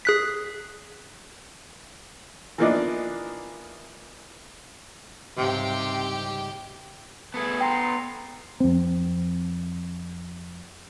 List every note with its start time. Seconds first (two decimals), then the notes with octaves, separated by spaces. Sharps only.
0.05 G#4 F#6 B6
2.58 E3 F3 A#3 B3 D4 D#4
5.37 C#2 G#2 C3 G3 G4 G5
7.34 E2 A3 B3 G#4 A4
7.61 F#5 G5 A#5 C6
8.60 F2 C4